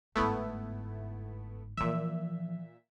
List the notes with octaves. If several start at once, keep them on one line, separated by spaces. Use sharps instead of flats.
G1 G#2 A3 B3 E4
A#2 E3 F3 E5